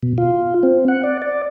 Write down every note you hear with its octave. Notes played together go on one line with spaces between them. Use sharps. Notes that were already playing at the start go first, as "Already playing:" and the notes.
B2
F4
C4
F#5
D5
D5